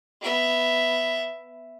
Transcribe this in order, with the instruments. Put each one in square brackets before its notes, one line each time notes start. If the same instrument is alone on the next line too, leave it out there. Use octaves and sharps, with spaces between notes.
[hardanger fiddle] B3 E5